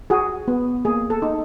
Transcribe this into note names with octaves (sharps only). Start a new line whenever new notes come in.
F#4 G#4
B3
A#3 G#4
A4
D#4